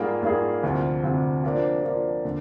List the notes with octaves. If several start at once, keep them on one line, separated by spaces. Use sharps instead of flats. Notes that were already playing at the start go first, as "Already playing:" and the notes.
Already playing: G#2 G3 A#3 F4 G#4
G#2 G3 A#3 F4 G#4
D2 C3 F3
D2 C3 F3
F3 A#3 D4
F3 A#3 D4
D3